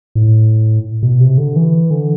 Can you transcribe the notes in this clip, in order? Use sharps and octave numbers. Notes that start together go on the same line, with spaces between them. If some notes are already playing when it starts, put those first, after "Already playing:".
A2
B2
C3
D3
E3
D3